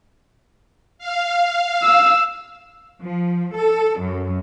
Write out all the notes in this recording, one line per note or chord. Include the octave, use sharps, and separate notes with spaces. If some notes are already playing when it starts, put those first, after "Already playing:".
F5
E6
F3
A4
F#2